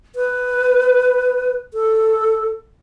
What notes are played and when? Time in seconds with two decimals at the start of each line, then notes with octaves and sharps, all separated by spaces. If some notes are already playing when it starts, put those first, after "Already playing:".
0.16 B4
1.74 A4